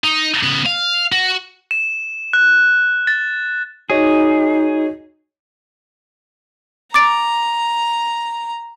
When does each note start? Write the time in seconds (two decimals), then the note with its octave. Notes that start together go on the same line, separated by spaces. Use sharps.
0.04 D#4
0.43 C#3 B3
0.66 F5
1.12 F#4
1.71 E7
2.33 F#6
3.07 A6
3.90 D#4 F#4 G#4 C#5 D#5
6.94 A#5 D6 A6 D7